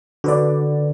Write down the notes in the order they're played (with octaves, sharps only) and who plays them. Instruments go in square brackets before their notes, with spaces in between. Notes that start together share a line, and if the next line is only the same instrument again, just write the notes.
[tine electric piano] D3 [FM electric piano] F#4 B4 D5